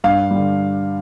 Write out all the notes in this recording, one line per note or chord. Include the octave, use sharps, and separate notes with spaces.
G2 F5
G3
D3